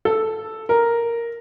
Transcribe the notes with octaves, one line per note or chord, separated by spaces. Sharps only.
A4
A#4